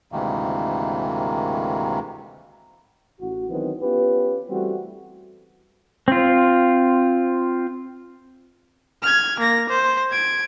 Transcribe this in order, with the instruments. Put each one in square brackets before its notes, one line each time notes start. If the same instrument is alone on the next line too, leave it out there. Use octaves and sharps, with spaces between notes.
[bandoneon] D2 G#2 C3 D#3 E3 A#3
[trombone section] A1 F#4
D#3 E3 F#3 A3 B3 C4
B3 C#4 F4 G4 B4
E3 G3 A3 C4 F#4
[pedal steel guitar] C4 F4
[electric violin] F6 G#6
A#3 A#6
C5
G#6 D7